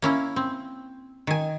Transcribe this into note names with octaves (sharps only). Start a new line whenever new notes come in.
A#3 C#4 E4
C4
D#3 G#5